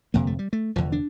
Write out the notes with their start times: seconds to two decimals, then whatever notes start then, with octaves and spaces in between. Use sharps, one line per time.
0.14 G1 F2 C3 A#3
0.27 A3
0.39 G3
0.53 A3
0.76 F1 E2 D3 F3
0.92 D4